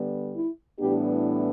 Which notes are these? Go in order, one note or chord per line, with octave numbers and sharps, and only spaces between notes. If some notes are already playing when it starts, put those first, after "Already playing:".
Already playing: D3 G3 B3
E4
A2 E3 G3 B3 D4 G4